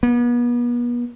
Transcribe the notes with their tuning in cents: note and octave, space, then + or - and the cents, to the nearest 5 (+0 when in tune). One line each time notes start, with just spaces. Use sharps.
B3 -40